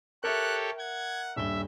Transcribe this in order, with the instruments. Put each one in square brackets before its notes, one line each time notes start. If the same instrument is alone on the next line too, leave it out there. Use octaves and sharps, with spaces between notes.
[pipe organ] G4 A4 C#5 [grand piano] A#4 E5 [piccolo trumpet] F#6
[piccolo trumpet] F#5 [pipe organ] G#6
[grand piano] D#1 G2 G7 [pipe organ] E5